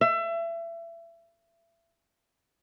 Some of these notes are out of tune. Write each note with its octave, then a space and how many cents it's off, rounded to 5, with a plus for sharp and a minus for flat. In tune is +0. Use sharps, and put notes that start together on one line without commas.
E5 +30